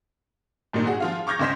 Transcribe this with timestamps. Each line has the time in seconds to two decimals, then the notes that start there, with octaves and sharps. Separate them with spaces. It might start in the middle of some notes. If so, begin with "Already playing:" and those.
0.73 G#1 A#2 G3 A#3 D#4
0.86 F#4 G#4 F#5
1.00 F3 F4 F5
1.27 C#6 D6 F6 G6 G#6 A#6
1.39 C#2 C#4 C5 D#5 B6 E7